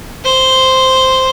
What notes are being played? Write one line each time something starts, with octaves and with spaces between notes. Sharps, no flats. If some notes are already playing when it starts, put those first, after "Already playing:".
C5